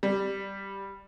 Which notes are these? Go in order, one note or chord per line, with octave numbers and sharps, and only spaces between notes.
G3